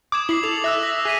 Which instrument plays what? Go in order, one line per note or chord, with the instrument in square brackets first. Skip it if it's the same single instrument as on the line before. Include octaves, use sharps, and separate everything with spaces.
[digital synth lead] D6 [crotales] D#6 G#6 E7
[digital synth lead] E4 [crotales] D6 C7 F#7
[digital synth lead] A4 [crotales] F7
[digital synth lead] E5 [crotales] E6 F#6 A#6
[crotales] D#6 A#6
[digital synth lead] G#4 [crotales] F#6 B6 D#7